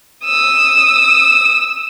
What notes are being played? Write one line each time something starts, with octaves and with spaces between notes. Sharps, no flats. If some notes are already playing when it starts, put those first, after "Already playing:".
D#6 E6